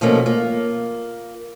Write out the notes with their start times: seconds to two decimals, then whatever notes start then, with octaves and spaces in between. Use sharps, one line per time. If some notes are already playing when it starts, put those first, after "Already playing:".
0.01 B2 F3 A3 A#3 C#4
0.26 A#3 F4